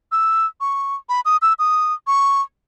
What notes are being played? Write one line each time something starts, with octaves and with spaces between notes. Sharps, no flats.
E6
C#6
B5
D#6
E6
D#6
C#6